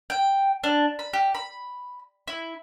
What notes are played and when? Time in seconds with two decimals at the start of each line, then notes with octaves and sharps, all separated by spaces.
0.10 G5
0.64 D4
0.99 B5
1.13 G4
1.35 B5
2.28 E4